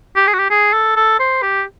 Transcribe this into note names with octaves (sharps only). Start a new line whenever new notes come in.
G4
G#4
F#4
G4
G#4
A4
A4
C5
G4